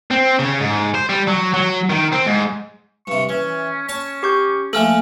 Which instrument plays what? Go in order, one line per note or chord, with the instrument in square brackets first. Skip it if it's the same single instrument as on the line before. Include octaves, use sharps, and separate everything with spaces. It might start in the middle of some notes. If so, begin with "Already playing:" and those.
[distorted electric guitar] C4
C#3
G#2
C5
G3
F#3
F#3
D#3
C4
G#2
[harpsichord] G2 C3 [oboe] C#6
[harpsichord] E3 [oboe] C#4
[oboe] C#4 [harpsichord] C#5 A5
[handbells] G4 C#6 G6
[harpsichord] F3 A3 A#3 [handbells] A4 [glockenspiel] G#5 F6 F#7